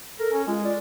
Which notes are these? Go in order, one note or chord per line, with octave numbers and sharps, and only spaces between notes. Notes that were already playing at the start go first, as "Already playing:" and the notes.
A4 A#4
C#4
G#3 F4
D5